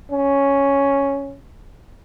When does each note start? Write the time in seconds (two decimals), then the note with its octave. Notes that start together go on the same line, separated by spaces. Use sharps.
0.11 C#4